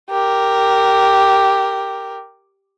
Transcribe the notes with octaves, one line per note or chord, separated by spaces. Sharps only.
G4 A#4